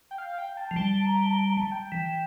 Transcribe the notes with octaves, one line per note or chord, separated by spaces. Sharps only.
G5
F5
G5
A5
F3
G3 A5
A#5
A5
A#5
A5
G5
E3